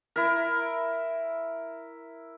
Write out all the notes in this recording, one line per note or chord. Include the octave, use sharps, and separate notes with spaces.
E4 A#4